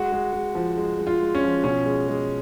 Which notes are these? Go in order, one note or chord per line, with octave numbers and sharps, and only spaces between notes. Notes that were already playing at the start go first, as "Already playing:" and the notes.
Already playing: G#3 F#4
G#3
G#3
F3
G#3
G#3
F4
G#3
C#4
F3
B2 C#4
G#3
G#3